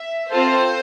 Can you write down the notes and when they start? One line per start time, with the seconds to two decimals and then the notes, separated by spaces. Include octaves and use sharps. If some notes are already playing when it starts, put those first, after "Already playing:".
Already playing: E5
0.31 C4 F4 A4 C5